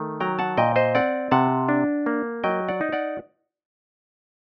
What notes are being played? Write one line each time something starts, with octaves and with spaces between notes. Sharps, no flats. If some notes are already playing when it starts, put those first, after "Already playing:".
Already playing: D#3 A3
F#3 G5 A#5
F#5 A5
A#2 D#5 G5
C5 D#5
C4 D5 F#5
C3 F#5 A5
D4
A#3
F#3 D#5 G5
D5 F#5
D#4
D5 F#5